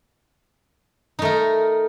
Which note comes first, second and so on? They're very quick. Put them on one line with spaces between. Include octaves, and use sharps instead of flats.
D#4 A3 A#4